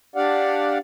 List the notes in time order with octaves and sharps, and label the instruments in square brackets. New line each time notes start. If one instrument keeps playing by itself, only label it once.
[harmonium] D4 G4 D5 F5 F#5